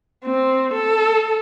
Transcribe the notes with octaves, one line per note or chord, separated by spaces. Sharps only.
C4
A4